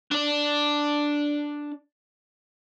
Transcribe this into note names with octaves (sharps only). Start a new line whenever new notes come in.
D4 D5